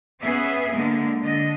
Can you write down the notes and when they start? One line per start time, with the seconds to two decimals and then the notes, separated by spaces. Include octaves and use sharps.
0.22 B3 C#4 G#4 E5
0.74 D3 G#3 A#3
1.22 D3 D#5